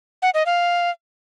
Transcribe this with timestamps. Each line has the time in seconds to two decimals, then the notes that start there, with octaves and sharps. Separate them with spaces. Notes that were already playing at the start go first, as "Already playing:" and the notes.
0.22 F#5
0.34 D#5
0.46 F5